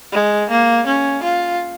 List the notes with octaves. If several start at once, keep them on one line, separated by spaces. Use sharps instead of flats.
G#3
A#3
C#4
F4